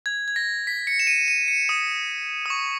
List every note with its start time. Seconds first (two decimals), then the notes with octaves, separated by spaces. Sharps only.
0.06 G#6
0.28 G#6
0.36 A#6
0.67 B6
0.87 C#7
1.00 E7
1.07 D#7
1.28 D#7
1.48 C#7
1.69 D#6
2.46 D#6
2.50 C#6